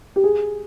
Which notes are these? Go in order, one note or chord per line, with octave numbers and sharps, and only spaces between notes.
G4
G#4